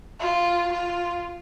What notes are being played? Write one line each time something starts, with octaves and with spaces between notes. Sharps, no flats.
F4
F4